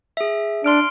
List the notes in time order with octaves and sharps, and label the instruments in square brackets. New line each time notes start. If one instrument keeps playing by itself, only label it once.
[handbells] G#4 E5
[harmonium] D4 [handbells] C6 F6 D7